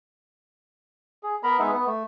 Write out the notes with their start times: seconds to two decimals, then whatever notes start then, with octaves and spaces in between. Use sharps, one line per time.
1.23 G#4
1.43 B3 A#4 A#5 B5
1.59 G#3 B3 D#4 E5
1.73 B3
1.86 A3